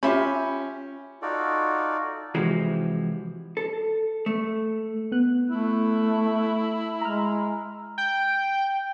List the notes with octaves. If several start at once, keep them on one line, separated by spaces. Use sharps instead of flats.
C#4 F4 G4 E5 B5
D#4 F4 F#4 A4 D5
C3 E3 F3 G#3 F#4 G4
A4
A3
B3 F#6
A3 E4
G#3 A#5 F6
G5